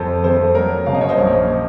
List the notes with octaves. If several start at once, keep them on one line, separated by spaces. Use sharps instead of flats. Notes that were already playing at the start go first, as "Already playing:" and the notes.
Already playing: F2 A4 C5
F2 A4 C5
F#3 A#4 C#5
F#1 F5
D#5
C#5
C5 D#5
A#1